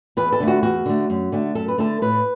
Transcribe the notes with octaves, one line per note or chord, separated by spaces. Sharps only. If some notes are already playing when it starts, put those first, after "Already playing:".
E2 B4
A4
D3 A3
F#4
E2 F#4
D3 A3
F#2
D3 A3
F#2 A4
B4
D3 A3 A4
A2 B4